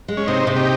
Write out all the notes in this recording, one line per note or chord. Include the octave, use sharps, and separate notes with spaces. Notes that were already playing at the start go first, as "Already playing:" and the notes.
G#3
C#4
C3 C4 D#4
C3
D#4 G4